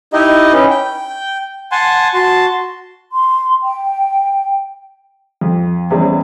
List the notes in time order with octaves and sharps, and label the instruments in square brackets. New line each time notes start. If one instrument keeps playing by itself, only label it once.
[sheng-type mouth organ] D#4 E4 G4 D#5
C#4 B4
G5
F#5 G#5 A5 C6
F#4 A5 C6
[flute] C6
G5
[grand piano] F2
E2 C3 G3 G#3 C#4